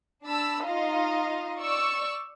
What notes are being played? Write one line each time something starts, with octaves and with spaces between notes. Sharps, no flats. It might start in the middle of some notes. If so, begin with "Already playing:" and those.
D4 A5 B5 E6
D#4 F4 D#5 F5
D5 C#6 E6